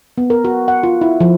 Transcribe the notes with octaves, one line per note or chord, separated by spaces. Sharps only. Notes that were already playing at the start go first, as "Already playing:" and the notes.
B3
A#4
F#4
F#5
F4
E4
F3